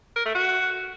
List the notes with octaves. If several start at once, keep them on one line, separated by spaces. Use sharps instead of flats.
A#4
A3
F#4